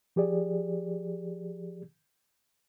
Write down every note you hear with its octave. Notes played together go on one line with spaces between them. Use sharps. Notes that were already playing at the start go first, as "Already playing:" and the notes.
F3 G4 G#4 D5